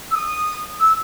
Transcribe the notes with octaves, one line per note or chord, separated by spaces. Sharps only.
E6
D#6
E6